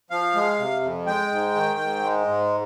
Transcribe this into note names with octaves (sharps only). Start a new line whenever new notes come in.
F3 F5
G#3
C3
F2
G#3 G5
G#2
D#3
G#2
G#3
G#2